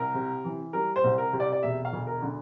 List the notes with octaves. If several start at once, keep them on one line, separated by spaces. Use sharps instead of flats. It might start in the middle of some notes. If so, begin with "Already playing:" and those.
Already playing: C2 A#4
C3
E3
G3 A#4
C5
C2
A#4
C3
D5
D5
E1 E5
F5
D2
A#4
D3